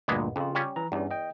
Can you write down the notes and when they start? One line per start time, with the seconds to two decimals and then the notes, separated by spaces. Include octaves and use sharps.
0.08 D2 G2 A#2 G#3 A#3 B3
0.36 F2 C#3 F4
0.55 G3 C#4
0.76 E3 A#5
0.92 E2 G2 G3 C#4
1.11 D#5 G5